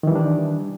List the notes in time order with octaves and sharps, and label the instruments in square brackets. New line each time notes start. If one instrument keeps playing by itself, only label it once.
[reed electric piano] D#3
E3
G3
D4